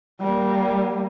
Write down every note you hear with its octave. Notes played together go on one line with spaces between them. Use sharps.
G3 A#3